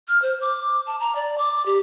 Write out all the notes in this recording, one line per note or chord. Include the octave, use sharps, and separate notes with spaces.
F6
C5
D6
A5
A#5
D5
D6
G4